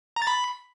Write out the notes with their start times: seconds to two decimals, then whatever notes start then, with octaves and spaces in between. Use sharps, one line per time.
0.16 A#5
0.22 A6
0.27 B5